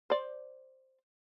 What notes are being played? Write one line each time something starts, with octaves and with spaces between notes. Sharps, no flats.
C5 D5